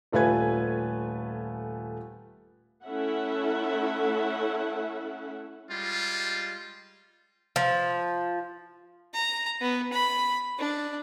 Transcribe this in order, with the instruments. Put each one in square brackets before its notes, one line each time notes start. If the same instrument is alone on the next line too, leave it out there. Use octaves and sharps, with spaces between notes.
[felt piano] D#1 A3 F4 B4 G#5 G#6
[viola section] A3 C#4 E4 A4 E5 F#5
[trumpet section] G3 G#3 F4
[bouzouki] F3
[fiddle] A#5
B3
B5
D4